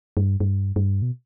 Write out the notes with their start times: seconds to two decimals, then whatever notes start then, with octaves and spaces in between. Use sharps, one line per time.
0.17 G2
0.40 G2
0.76 G2
1.02 B2